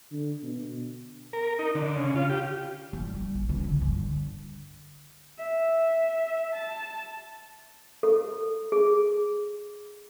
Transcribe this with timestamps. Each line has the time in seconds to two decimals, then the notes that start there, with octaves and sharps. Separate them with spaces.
0.12 D3
0.43 B2
1.33 A#4
1.59 D#4
1.75 D3
1.96 C#3
2.15 F4
2.30 G4
2.93 G2
3.14 G3
3.34 A#1
3.49 C#2
3.64 D3
3.81 G2
3.98 D3
5.39 E5
6.53 A5
8.03 A4
8.72 G#4